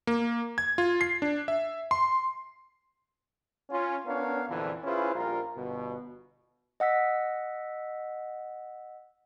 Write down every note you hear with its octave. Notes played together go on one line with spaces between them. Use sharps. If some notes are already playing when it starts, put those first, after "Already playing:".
A#3
G#6
F4
C7
D4
E5
C6
C#4 F4
B3 C#4 D4 A#4 C#5 F5
A#1 F2 A#2 D3 E3
C#4 E4 F4 G#4 B4 C5
A#1 G3 F4 A#4
G1 B2
D#5 F#5 E6 B6